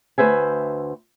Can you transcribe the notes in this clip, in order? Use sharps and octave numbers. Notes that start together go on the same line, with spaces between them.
D2 B4 C5 E5 G#5